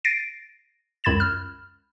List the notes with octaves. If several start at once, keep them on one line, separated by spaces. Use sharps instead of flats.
A6 A#6 C7 D7 D#7
C#2 F#2 B5 G#6 A6 E7
F6